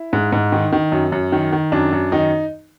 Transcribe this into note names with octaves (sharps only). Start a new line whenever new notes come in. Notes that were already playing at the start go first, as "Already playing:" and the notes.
Already playing: E4
G#2
G#2
D#3
D#3
F#2
F#2
D#3
D#3
F#2 D4
F#2
D#3 D#4